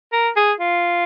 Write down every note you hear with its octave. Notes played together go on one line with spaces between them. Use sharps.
A#4
G#4
F4